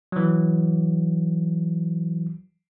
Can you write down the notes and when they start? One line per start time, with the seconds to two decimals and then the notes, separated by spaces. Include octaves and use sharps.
0.12 E3 F#3